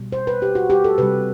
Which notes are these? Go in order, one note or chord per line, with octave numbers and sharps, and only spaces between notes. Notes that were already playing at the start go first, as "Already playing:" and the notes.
Already playing: B2 G3
C5
B4
G4
F#4
G4
A4
C3 G3 B4